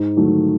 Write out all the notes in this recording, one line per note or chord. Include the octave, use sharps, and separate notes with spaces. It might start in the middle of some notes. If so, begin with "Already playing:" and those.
Already playing: G#2
D#3 F#3 A3